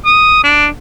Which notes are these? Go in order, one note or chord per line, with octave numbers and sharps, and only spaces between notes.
D#6
D4